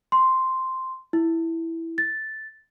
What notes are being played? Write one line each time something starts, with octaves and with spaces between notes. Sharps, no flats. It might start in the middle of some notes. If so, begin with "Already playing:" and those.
C6
E4
A6